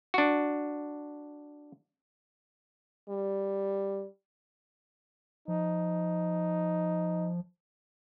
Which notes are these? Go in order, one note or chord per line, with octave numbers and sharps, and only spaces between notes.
D4 F#4
G3
F3 D#4